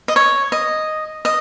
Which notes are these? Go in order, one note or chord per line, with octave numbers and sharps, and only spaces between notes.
D#5
C#5
D#5
D#5